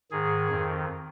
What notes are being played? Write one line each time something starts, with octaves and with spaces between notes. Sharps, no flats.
G#2 D#3 G#4
F2 D#3